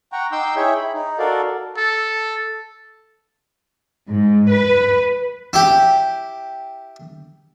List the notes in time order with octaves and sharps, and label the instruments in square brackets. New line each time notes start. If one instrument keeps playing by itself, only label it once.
[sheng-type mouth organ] F#5 G5 A#5 C#6
D#4 G5 C6 D6 E6 G6
E4 G#4 C#5 E5 G5
B5
D#4
F#4 A4 A#4 D5 F5
[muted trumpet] A4
[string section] G#2
B4
[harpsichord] E4 G4